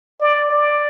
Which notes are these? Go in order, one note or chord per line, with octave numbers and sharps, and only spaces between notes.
D5
D5